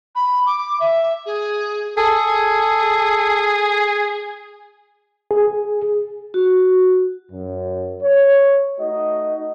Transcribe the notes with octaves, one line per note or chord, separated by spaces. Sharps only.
B5
D6
E5
G#4
G#4 A4
G#4
F#4
F#2
C#5
A3 D#4 F#4 D#5